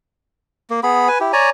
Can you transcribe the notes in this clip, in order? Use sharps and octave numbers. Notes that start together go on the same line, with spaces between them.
A#3
B3 G#4 B5
B4 G#5
E4 G4
C#5 D5 G#5 A#5